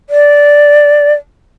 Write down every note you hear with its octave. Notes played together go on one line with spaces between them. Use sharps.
D5